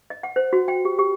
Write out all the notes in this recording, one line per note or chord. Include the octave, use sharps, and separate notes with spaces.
D#5
F#5
C5
F#4
G5
G4
G4